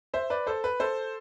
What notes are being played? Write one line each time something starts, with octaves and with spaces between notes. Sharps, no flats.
C5 E5
B4 D5
A4 C5
B4
A4 C5